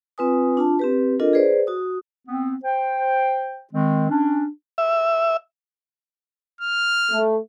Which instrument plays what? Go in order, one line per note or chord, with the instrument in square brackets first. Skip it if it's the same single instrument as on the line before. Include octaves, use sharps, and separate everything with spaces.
[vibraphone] C4 F4 B4 G#5 D#6
D4 F4 A5
C4 G4 B4
D4 F4 A4 A#4 D#5
G#4 B4 C5 D5
F#4 D#6
[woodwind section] B3 C4
C5 G5
D#3 G#3 C4
C#4 D4
[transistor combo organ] E5
[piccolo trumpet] F6
[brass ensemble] A3